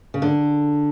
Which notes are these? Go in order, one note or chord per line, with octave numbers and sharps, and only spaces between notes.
C#3
D3